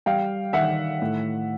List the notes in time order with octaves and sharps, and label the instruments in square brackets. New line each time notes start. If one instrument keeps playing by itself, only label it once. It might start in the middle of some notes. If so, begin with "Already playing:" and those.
[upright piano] G3 F5 G5
D#3 E5 F#5
A2